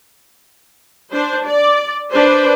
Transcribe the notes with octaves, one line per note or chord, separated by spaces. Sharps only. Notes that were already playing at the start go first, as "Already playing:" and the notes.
D4 C5
D5
D4 B4 C5